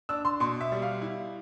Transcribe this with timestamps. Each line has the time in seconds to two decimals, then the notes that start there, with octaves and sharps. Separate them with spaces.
0.09 D4 E6
0.25 C6
0.40 B2 C6
0.61 E5
0.72 G3
0.82 F5
1.02 E4